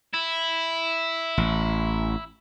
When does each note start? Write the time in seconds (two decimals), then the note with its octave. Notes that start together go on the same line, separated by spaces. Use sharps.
0.13 E4
1.38 A1